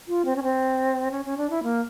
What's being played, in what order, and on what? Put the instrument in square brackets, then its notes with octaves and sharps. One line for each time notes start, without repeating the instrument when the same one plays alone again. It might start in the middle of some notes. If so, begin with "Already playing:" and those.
[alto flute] F4
C4
C#4
C4
C#4
C#4
D4
E4
A#3